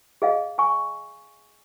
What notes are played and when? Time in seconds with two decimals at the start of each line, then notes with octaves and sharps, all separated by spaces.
0.22 G#4 D#5 F5
0.58 G#5 C#6